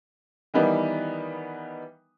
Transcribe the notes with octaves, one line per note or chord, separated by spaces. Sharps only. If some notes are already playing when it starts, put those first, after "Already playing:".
D#3 E3 G3 B3 D#4